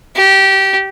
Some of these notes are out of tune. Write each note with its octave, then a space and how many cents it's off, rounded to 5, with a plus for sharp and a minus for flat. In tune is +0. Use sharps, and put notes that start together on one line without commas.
G4 -20